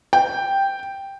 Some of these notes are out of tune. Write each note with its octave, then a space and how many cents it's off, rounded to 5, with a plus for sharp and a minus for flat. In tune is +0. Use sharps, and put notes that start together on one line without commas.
G5 +0